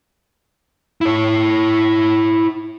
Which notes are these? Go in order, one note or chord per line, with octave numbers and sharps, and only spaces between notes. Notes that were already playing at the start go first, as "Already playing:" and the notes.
E4 C#5